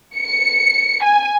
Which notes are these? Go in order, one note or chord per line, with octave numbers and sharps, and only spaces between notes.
C#7
G#5